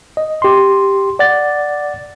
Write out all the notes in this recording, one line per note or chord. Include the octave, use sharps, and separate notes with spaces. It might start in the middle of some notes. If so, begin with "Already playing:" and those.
D#5
G4 C6
D5 F#5 A6